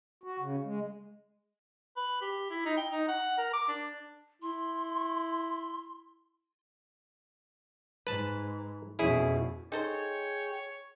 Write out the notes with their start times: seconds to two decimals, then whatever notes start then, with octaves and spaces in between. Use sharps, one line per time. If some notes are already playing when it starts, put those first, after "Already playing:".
0.24 F#4
0.40 C#3
0.64 G#3
1.96 B4
2.21 G4
2.50 E4
2.65 D#4
2.77 G5
2.91 D#4
3.08 F#5
3.37 A#4
3.53 D6
3.68 D4
4.42 E4 C6
8.07 G#2 B4 A5
8.99 F2 B2 C#4 E4 G#4
9.72 D#4 G#4 A4 C5 C#5 G5